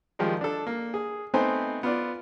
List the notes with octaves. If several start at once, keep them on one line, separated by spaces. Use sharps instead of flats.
D#3 F3 G3 G#3 D#4
D4 A4
A#3
G#4
A3 B3 C4 D#4 C5 G#5
B3 F4 D5